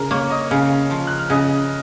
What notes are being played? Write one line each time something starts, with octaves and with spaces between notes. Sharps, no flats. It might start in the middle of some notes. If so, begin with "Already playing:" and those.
Already playing: C#3 A#4 A#5
A#3 C#5 C#6
D#5 D#6
C#3 F5 F6
F3
F#6
F6
C#3 D#5 D#6